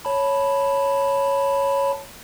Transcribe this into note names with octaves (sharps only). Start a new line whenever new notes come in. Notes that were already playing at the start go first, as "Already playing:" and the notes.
C#5 A5 B5